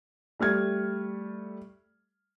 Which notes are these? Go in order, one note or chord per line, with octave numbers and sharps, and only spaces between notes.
G3 A3 F6 G#6